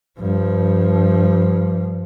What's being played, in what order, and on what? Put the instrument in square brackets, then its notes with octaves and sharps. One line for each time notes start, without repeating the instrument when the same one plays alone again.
[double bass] G2 F3